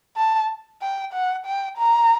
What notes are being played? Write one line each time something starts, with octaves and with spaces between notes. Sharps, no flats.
A5
G5
F#5
G5
A#5